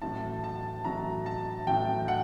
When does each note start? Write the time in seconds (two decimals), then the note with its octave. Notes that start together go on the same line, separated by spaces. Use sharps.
0.02 A1 A2 F#3 A5
0.44 A5
0.84 A1 A2 F#3 A#5
1.26 A5
1.67 A1 A2 F#3 G5
2.08 F#5